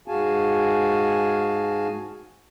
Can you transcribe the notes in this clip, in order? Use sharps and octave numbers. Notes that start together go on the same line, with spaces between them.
G#2 F#4 G#4 F5 G#5 A5